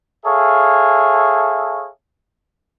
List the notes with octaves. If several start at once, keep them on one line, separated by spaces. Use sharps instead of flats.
G#4 A4 C#5 E5 F5